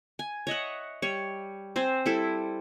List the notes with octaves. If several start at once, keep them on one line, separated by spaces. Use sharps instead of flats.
G#5
C#5 D#5 E5 F#5
G3 C#5
C4 C5 G#5
G3 E4 A4